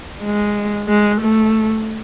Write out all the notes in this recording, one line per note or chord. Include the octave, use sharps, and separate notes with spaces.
G#3
G#3
A3